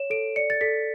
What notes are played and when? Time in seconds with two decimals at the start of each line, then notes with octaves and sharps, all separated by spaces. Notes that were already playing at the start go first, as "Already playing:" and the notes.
Already playing: C#5 E7
0.10 A4 D7
0.36 D5 C#7
0.50 A6
0.61 A4 B6